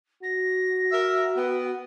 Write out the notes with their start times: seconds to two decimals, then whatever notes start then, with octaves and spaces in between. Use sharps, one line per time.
0.23 F#4 A#6
0.91 A#4 E5
1.37 B3 G5